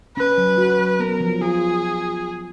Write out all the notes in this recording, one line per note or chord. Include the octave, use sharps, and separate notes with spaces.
C#4 B4
F#3
F#4
F#3
B3 A#4
F3
F4 G#4